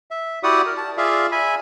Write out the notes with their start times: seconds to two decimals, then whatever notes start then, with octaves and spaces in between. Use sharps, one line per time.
0.11 E5
0.43 E4 F#4 G4 D5 F#5 D#6
0.66 A#4
0.77 A5
0.98 F4 G#4 D5 E5 F5
1.32 E5 G#5 B5